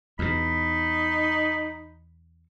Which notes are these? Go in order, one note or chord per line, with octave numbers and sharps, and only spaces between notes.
E2 B2 D#4 B5